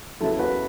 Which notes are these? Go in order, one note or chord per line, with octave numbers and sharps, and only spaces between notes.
E2 C#3 F#3 E4 A4
F#4 B4